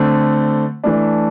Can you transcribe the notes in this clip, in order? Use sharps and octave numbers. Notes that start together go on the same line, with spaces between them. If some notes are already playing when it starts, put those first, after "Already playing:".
Already playing: D3 A3 C4
E3 A3 D4